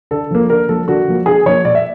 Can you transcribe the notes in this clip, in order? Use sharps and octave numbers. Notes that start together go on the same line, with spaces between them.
D3 A4
F3 A#3
D3 A#4
F3 A#3 A4
D3 F#4
F3 A#3
D3 G#4
F3 A#3 C#5
A#2 D5
E5